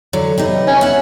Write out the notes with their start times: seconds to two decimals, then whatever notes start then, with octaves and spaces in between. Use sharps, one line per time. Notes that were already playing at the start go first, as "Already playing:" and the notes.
0.13 D3 F#3 C#5
0.38 C3 B3 D#4
0.67 C#4
0.81 E5 F#5